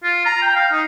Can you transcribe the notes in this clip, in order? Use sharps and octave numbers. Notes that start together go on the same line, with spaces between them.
F4
A#5
G5
F5
D#4